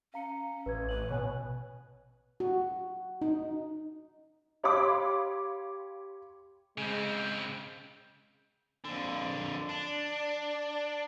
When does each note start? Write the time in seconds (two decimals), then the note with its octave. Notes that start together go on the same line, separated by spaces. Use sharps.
0.14 C#4 F5 A#5 C#7
0.66 A1 B4 G#6
0.89 B4 F#7
1.10 B2 C#5 G#5 F#6
2.40 F#4
3.22 D#4
4.63 G4 C#5 F5 B5 C6 D6
6.78 C#3 G#3 C4
8.84 F2 D3
9.69 D4